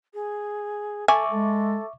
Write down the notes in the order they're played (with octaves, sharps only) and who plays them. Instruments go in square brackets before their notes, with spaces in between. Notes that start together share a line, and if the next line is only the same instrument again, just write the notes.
[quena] G#4
[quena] A4 [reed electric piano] E5 C#6 D6 [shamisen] G#5
[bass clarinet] G#3 [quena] A4